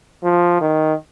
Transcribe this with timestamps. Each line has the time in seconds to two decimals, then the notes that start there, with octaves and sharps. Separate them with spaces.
0.24 F3
0.61 D#3